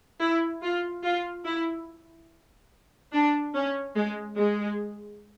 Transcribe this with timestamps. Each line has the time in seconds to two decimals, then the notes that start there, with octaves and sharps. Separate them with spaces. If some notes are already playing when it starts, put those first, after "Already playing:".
0.20 E4
0.62 F4
1.04 F4
1.45 E4
3.13 D4
3.55 C#4
3.96 G#3
4.38 G#3